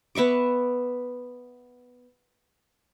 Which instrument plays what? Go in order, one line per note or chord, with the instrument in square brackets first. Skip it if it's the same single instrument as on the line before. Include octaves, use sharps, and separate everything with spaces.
[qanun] B3 E5 C#6 D6